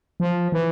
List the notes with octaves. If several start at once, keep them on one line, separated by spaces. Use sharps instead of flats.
F3
E3